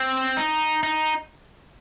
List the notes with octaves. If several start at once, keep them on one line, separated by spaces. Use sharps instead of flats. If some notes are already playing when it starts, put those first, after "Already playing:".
Already playing: C4
D#4
D#4